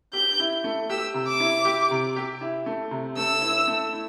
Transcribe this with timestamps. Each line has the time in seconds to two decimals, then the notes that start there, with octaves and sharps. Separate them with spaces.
0.13 G4 G6
0.40 E4
0.64 A3
0.90 G4 E6
1.14 C3
1.28 D6
1.40 E4
1.65 G4
1.91 C3
2.16 G4
2.41 E4
2.66 A3
2.91 C3
3.17 A3 E6
3.42 E4
3.68 A3
3.93 E4